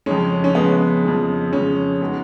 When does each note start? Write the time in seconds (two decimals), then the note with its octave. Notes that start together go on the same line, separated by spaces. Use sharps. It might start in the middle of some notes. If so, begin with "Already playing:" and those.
0.06 F2 C#3 G#3 C#4
0.44 C#4
0.55 F2 C#3 G#3 B3
1.03 F2 C#3 G#3
1.53 F2 C#3 G#3 C#4
2.01 G#3 B3 D#4 F#4